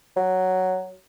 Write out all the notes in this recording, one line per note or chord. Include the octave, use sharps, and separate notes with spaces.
F#3